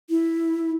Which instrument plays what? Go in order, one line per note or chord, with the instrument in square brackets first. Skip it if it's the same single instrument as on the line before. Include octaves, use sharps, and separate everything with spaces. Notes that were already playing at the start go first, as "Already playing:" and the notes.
[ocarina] E4